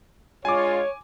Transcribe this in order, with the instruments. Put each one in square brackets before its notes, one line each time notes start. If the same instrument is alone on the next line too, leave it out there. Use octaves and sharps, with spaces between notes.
[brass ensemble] G#3 D4 F4 [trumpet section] C#5 [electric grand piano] G#5 D6